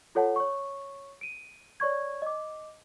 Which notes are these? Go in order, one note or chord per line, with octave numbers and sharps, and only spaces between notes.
F4 A4 C#5 F#5 A5
C#5 C#6
D7 D#7
C#5 D5 C#6 G#6
D#5 D6